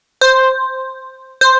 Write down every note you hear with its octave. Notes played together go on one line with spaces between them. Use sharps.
C5
C5